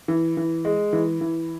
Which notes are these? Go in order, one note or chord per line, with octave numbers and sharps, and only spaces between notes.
E3
E3
G#3
E3
E3